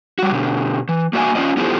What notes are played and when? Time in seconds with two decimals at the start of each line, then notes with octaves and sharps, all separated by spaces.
0.19 G3 F#4
0.32 B2 D3
0.89 E3
1.13 A#3 F#4 D5 E5 G#5
1.35 C#4 F4 D5 D#5
1.57 B3 E4 F4 G4 A4 C5